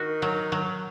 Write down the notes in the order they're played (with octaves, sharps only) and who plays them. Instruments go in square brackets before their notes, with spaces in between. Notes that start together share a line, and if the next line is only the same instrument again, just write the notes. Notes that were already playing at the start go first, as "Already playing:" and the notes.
Already playing: [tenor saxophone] D#3 [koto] F#4
[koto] F#3
F#3